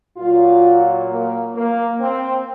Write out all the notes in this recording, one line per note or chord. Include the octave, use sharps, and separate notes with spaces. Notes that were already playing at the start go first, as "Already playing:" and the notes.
A#2 F#3 F4
A#3
A#3
C4